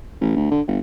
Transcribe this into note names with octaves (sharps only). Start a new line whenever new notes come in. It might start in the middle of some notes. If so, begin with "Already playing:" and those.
A1
D2
D3
G1